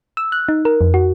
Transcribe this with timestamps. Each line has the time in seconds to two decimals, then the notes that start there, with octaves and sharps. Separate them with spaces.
0.17 E6
0.32 F#6
0.49 D#4
0.65 A#4
0.81 F2
0.94 F#4